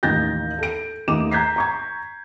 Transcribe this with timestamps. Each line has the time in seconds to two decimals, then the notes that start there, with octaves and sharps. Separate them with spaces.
0.03 A1 D#2 D#4 G6 A6 A#6
0.59 A4 D7
1.08 D#2 A3 D#4 D6 E7
1.31 A#5 G6 G#6 B6 C7
1.56 A#5 C#6 G#6